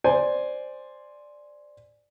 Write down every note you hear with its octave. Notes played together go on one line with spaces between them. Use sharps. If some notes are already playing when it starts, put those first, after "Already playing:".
C5 D5 G#5